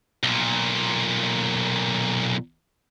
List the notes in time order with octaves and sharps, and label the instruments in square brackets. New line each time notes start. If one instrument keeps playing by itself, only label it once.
[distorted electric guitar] B1 A#2